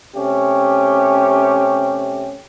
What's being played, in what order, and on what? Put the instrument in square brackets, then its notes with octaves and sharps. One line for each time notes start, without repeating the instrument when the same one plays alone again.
[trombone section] C3 A3 C#4 G4